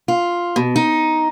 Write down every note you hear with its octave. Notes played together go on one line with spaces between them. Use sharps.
F4
B2
D#4